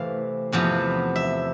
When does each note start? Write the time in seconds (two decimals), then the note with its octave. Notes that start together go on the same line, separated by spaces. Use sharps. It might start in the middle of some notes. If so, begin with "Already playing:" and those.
Already playing: C3 E3 A3 C4 F5
0.52 E2 C3 F3 B3
1.16 E5